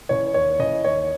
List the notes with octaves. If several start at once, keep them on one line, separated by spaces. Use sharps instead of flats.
C#3 E3 C#5
D#2 C#5
C#3 E3 D#5
D#2 C#5